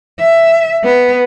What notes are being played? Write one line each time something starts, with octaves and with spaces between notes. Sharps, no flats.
E5
B3